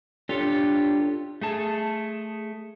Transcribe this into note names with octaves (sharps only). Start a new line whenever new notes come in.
D4 F4 G4 A4 C#5
A3 G#4 A5